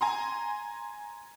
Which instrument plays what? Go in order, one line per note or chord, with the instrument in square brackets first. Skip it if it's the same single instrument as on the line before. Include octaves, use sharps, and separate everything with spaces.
[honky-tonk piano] G#5 A#5 C6